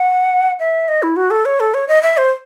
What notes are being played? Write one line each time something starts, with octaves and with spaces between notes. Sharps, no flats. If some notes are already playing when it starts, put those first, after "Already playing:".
Already playing: F#5
E5
D#5
E4
F#4
A4
C#5
A4
C#5
D#5
E5
C5